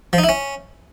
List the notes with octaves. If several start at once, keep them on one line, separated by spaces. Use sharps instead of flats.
F3
D#4
E4
C#4